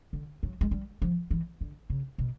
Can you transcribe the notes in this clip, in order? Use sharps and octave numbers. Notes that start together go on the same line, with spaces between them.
D3
F#3
G#3
G3
F3
E3
D3
C#3
B2